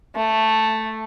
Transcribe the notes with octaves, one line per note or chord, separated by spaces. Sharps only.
A3